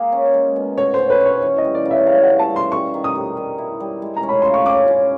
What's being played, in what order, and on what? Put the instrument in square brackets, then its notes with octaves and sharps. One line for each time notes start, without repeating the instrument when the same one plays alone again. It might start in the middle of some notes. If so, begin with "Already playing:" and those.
Already playing: [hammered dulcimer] A#3 G#4
C#4
G#3
B2
[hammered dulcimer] F#4 [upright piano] C#5
[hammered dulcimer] C#4 [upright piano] C5
[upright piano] B4
[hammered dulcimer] C#4 [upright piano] C#5
[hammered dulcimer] E3
[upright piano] D#5
[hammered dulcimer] G3
[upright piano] D5
[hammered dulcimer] C#3
[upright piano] E5
[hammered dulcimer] C#3 [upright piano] F5
[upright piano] F#5
[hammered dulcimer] C#3
[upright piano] A5
[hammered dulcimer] G3
[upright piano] C6
[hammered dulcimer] G3 [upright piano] C#6
[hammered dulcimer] D#3
[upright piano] D#6
[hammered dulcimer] G3
D#3
E4
G3
G#3
[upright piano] A#5
[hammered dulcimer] C#4
[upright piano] B5
[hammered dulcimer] F4 [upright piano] C6
[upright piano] C#6
[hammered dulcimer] C#4 [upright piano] D6
[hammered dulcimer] C#4